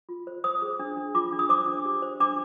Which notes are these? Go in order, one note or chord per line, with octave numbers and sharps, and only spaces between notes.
F4
C5
C5 D#6
G#4
D4
D4
F4 D6
D4
D#6
C5 D6
D4
G4
C5
D4 D6